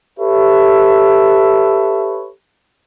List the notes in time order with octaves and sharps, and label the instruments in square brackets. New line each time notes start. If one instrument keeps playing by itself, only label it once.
[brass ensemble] G4 A4 B4 C#5 E5